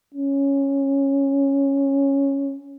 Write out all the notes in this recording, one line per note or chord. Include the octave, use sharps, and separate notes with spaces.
C#4